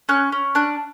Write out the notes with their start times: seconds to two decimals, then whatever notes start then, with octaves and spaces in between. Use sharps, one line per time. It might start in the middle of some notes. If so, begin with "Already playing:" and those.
0.09 C#4 F#6
0.32 C#4
0.55 D4 F#6